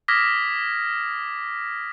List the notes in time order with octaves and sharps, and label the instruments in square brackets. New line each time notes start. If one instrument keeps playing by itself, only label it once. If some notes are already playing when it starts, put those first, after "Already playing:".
[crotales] D6 D#6 F6 G#6 A#6 B6